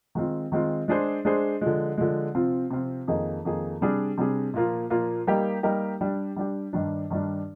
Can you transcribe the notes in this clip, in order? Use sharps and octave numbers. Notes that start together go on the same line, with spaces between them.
D#3 G#3 C4 F4
D#3 G#3 C4 F4
G#3 D4 G#4 C5
G#3 D4 G#4 C5
D3 F3 G#3
D3 F3 G#3
C3 F3 C4 F4
C3 F3 C4 F4
F2 D#3 A#3 D#4 G#4
F2 D#3 A#3 D#4 G#4
C3 G3 D4 G#4
C3 G3 D4 G#4
A#2 F3 A#3 F4
A#2 F3 A#3 F4
G3 A#3 D#4 G4 A#4
G3 A#3 D#4 G4 A#4
G3 D4 G4
G3 D4 G4
G2 D#3 G3 D4
G2 D#3 G3 D4